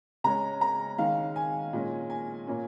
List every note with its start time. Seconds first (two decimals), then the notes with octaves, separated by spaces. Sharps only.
0.24 C#3 G#3 C#4 A#5
0.61 A#5
0.98 D#3 G#3 C#4 F5
1.36 G#5
1.73 A#2 G#3 C#4
2.10 G#5
2.47 A#2 A#3 C#4